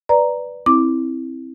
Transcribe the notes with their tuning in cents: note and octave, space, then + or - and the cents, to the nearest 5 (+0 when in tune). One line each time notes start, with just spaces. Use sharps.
B4 +0 D5 +0 A#5 +0
C4 +10 E4 -10 D6 +0